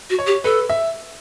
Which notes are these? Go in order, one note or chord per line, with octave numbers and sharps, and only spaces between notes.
F#4
C#5
G4
A4 B4
E5